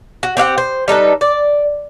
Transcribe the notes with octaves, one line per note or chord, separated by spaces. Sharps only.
F#4
C4 G4 F5 F#5
C5
G3 D#4 A4 B4
D5